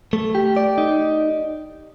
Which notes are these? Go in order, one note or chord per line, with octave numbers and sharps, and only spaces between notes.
A3
G4
D5
D#4